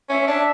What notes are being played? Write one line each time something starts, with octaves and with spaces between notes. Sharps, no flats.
C#4 E5
D4